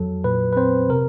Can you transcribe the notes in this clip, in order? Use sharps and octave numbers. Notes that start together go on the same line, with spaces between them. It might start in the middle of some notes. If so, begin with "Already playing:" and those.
Already playing: F2 F#3 A4
A#2 B4
B4
C4 C5
C3 A#4